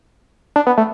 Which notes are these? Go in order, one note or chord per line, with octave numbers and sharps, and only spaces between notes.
D4
B3
A3